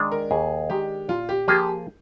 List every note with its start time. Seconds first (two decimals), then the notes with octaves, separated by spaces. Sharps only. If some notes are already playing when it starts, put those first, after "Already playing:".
Already playing: D#3 G#3 D4
0.12 A#4
0.31 D#2 G#4
0.70 D#3 G#3 D4 G4
1.08 A#2 F4
1.29 G4
1.48 F3 A#3 F4 G4 G#4